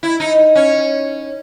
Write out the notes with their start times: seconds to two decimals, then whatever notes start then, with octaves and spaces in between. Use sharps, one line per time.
0.03 E4
0.20 D#4
0.55 C#4